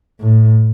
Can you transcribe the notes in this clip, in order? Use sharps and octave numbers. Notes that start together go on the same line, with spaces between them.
A2